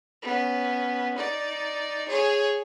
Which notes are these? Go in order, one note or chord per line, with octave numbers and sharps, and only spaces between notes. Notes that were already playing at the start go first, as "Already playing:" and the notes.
B3 C#4
D#4 D5
G#4 C#5